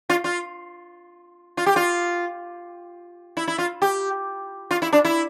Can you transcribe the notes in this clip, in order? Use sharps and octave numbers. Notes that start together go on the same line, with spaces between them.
F4
F4
F4
G4
F4
E4
E4
F4
G4
F4
E4
D4
E4